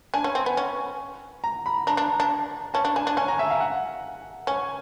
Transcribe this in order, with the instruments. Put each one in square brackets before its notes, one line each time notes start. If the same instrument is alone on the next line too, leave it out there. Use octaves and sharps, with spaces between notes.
[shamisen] D4 [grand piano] G#5
[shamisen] C#4
C4
B3
C#4
[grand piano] A#5
B5
[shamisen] D4 [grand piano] A#5
[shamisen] D4
D4
[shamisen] C#4 [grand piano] A5
[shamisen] D4
[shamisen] D4 [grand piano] G#5
[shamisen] D4
[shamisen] C#4 [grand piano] G#5
[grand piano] A#5
E5
F5
F#5
[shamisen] C#4 [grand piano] G#5